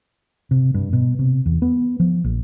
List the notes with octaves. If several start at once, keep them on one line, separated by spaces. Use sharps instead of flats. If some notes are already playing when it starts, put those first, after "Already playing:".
C3
G2
B2
C3
E2
B3
F3
A#1